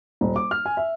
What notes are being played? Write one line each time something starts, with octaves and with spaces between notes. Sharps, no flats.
D#1
D6
F6
G#5
E5